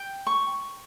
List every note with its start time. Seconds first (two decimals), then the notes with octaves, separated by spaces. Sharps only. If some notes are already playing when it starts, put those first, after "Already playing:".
Already playing: G5
0.27 C#6